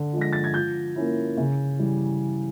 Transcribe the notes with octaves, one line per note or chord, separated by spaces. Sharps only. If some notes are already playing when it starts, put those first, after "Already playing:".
Already playing: D3
F3 G#3
A#6
A6
G#6
F3 G6
A#3 C#4 E4
C#3
E3 G3